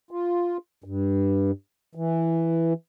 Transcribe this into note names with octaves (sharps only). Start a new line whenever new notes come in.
F4
G2
E3